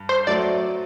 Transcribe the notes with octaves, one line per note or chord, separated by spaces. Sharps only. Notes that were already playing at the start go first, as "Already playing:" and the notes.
Already playing: G2
C5
F#3 A3 D5